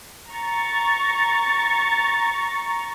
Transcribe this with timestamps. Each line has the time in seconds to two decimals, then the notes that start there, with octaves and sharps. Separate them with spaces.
0.31 A#5 C#6 A6